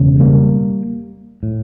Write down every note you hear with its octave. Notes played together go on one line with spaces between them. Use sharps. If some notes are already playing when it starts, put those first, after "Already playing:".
Already playing: E1 C#3
G3 A#3
A2